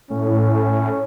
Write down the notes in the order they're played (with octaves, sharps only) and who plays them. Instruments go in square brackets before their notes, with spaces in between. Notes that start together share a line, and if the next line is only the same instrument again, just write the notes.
[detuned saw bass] A2 [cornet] C#4